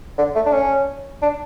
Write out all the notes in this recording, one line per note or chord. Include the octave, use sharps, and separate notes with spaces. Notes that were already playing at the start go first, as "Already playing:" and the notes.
D3
A3
D4
C#4
D4